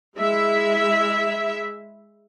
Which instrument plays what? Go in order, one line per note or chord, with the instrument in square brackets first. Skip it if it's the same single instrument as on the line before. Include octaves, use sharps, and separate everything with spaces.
[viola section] G#3 E4 E5